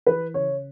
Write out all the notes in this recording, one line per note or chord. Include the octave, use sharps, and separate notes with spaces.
E3 B4
C#3 C#5